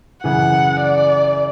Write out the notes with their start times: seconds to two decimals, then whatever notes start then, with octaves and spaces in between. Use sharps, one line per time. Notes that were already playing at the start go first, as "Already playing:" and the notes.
0.24 F#2 C#3 E3 F#5
0.80 D5